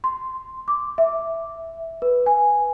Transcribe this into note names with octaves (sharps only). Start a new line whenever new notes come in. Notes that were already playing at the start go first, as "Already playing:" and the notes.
C6
D6
E5
B4
G#5